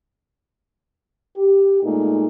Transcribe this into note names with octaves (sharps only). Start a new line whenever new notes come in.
G4
A#2 G#3 A3 D#4